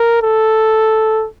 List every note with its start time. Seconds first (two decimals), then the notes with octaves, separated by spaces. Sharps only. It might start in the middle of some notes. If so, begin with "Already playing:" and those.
Already playing: A#4
0.23 A4